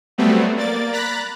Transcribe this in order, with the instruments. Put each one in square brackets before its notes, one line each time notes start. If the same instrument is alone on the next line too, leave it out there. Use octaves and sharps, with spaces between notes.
[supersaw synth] F#3 G3 A3 B3 C4
A#3 D5 A6
A#5 B5 F#6 A6 B6